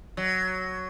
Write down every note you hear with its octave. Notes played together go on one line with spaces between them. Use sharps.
F#3